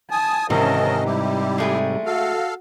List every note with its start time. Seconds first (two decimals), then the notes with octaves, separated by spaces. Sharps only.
0.11 G#5 A5 D#6
0.50 G#2 C3 D#3 E3 C#4 A#4 D#5 A5
1.05 G3 E4 G4
1.58 G#3 A3 G#4
2.06 F#4 A4 F5